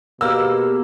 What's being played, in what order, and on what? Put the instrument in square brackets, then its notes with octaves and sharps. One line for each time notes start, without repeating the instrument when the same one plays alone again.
[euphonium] B2 [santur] A#3 [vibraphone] G4 G#4 A#4 [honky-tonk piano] E6